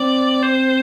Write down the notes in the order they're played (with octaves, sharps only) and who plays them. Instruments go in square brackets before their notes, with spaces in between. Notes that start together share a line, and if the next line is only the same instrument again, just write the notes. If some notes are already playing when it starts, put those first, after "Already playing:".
Already playing: [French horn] C4 [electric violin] D5
[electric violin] C5